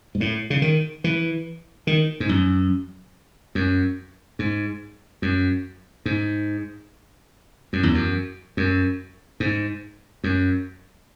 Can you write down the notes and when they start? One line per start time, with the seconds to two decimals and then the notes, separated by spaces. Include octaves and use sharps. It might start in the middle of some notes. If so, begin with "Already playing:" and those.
0.15 G#2
0.20 A2
0.50 C#3
0.62 D#3
1.04 E3
1.87 D#3
2.20 G#2
2.29 F#2
3.55 F#2
4.39 G#2
5.22 F#2
6.06 G#2
7.73 F#2
7.83 E2
7.95 F#2
8.57 F#2
9.40 G#2
10.24 F#2